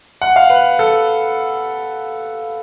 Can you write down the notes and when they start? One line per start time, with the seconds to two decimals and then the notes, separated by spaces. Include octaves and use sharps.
0.22 F#5
0.36 F5
0.50 B4
0.79 A4